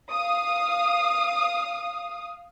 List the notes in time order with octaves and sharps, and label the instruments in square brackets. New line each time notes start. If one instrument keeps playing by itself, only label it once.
[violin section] F5 D#6